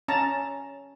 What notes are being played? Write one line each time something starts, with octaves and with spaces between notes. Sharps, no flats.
C#4 A5 A#5